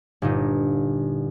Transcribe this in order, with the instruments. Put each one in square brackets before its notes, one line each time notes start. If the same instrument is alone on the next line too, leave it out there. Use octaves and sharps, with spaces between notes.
[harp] G1 A#2 D#4